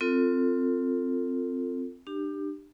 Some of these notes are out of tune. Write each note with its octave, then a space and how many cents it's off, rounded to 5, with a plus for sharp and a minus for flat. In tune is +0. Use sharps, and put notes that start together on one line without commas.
C4 +0 F4 +0 A4 +30
D4 +35 G4 +0